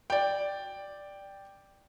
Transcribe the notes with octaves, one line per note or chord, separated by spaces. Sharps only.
D5 G5